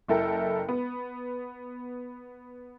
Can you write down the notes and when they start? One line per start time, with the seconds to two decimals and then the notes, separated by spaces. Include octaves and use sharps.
0.08 F#1 E4 A4 A#4 G5
0.69 B3